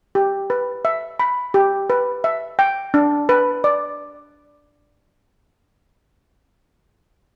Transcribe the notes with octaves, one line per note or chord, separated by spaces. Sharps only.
G4
B4
E5
B5
G4
B4
E5
G5
D4
B4
D5